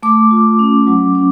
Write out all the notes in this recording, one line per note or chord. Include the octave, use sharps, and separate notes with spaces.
A3 D6
F4
C#4
F#3
C#4